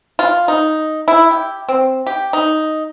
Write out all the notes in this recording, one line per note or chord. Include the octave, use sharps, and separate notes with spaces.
F4
D#4
E4
G4
C4
G4
D#4